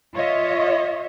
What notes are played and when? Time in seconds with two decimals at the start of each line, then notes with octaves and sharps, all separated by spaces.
0.15 F4 C#5 D#5 E5